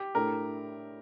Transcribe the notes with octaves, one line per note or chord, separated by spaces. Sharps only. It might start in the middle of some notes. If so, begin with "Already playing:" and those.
Already playing: G4
A2 A3 D4 A4 A#4